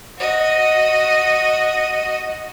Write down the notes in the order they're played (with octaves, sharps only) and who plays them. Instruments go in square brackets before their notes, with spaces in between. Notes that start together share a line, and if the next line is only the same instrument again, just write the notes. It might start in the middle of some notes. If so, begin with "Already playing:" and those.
[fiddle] F#4 D#5